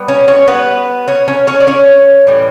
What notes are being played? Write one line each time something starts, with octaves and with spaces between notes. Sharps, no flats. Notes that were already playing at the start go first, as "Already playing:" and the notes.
Already playing: G3 B3
C#4 C#5
C#4 C#5
B3 B4
C#4 C#5
C#4 C#5
C#4 C#5
D5
C#4 C#5
A2 E3 G3